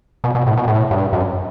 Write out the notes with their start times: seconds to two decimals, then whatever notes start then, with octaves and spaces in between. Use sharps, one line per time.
0.24 B2
0.35 B2
0.47 A2
0.57 B2
0.68 A2
0.91 G2
1.13 F#2